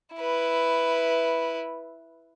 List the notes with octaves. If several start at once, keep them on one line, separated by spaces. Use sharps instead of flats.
E4 B4